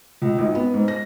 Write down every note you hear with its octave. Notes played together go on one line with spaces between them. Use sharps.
C#2
G#1
B3
G#2
A#6